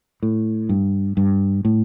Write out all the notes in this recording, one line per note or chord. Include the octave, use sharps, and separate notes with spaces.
A2
G2
G2
A2